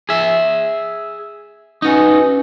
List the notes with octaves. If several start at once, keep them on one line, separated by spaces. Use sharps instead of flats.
G#4 E5
C#4 D#4 F#4 B4 G#5